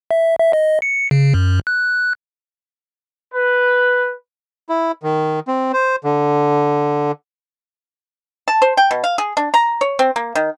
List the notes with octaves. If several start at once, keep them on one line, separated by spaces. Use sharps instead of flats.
E5
E5
D#5
C#7
C#3
F#2
F#6
B4
E4
D#3
C4
C5
D3
A5
C5
G5
B2
F5
G#4
D4
A#5
C#5
C4
A#3
D#3